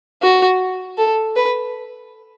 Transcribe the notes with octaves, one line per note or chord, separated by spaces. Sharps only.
F#4
A4
B4